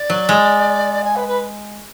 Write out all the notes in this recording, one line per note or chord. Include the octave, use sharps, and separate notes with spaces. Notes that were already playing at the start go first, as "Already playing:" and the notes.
Already playing: D5
F#3
G#3
G#5
B4
B4